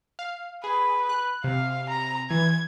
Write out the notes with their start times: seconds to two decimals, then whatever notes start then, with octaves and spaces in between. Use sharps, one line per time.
0.19 F5
0.64 G#4 B4
1.09 F#6
1.44 C3 F5
1.89 A#5
2.30 E3 G#6